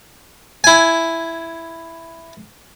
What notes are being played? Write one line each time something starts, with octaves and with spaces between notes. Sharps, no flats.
E4 G#5